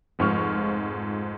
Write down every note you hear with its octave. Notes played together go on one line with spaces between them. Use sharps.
F1 G#2 F3 C#6 F6